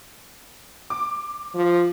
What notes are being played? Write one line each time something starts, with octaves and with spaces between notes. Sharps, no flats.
D6
F3